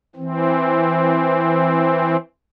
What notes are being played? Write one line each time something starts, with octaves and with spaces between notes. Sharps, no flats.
E3 C4